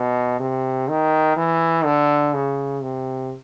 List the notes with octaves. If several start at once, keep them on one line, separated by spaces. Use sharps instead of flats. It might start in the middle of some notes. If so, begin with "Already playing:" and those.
Already playing: B2
C3
D#3
E3
D3
C#3
C3